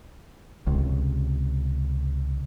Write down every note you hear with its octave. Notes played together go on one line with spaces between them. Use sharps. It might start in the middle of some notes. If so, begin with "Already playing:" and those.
C#2 C3